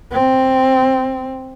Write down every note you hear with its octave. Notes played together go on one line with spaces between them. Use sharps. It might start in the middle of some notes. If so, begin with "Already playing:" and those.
C4